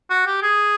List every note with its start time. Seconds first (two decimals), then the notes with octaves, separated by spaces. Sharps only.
0.10 F#4
0.26 G4
0.43 G#4